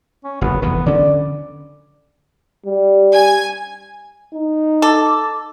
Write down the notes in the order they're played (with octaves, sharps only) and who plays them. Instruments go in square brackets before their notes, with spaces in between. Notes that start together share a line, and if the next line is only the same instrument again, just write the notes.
[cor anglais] C#4
[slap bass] F#1 E2 [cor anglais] B3
[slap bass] F1 E2 E3 [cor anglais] B3
[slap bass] D3 C#4 [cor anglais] D5
[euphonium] G3
[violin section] G#5 G#6
[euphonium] D#4
[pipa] A4 [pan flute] D6